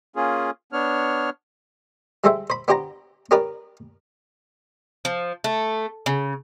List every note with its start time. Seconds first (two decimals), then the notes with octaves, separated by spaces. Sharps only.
0.16 A#3 C#4 F4 G#4
0.73 B3 D4 C#5 F6
2.24 G3 G#3 A4 C5 E5 G5
2.50 C5 B5
2.68 B3 D4 G4 C5 G5 A#5
3.31 C#4 G4 A#4 B4 D5
5.05 F3
5.44 A3
6.06 C#3